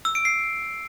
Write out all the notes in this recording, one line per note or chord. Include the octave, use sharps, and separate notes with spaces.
E6
D7
C7